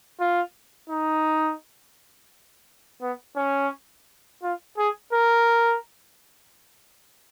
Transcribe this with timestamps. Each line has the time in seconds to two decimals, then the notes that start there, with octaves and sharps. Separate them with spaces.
0.20 F4
0.90 D#4
3.02 B3
3.36 C#4
4.43 F4
4.78 G#4
5.13 A#4